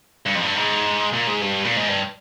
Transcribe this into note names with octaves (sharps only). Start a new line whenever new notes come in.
G2
F2
G2
G#2
A#2
G#2
G2
A#2
G#2
G2